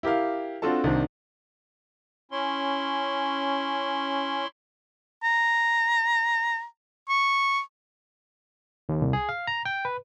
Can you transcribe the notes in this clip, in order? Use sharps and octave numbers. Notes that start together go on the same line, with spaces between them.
E4 G4 A#4 F5
C4 D4 F4 F#4 A4 A5
C2 D#3 D4 C5
C#4 E4 C6
A#5
C#6
D#2
C2
G#4
F5
A#5
G5
B4